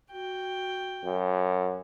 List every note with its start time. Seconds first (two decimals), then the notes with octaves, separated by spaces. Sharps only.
0.11 F#4 G5
1.05 F#2